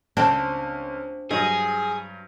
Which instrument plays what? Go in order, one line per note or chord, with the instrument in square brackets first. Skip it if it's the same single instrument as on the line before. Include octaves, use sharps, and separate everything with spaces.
[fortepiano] C#2 [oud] C4 [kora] D4
[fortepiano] G2 F#3 [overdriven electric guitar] G#4 [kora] D#5